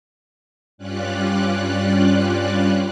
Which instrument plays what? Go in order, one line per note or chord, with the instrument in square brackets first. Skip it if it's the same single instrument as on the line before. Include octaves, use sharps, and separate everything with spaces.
[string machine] G2 G3 C#4 F4 D5 F#6